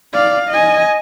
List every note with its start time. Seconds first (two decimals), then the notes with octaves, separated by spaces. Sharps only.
0.13 D5 F5
0.49 D#5 G#5